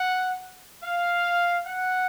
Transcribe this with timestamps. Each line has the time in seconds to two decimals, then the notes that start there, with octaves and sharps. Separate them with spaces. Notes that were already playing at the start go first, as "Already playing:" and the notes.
Already playing: F#5
0.84 F5
1.66 F#5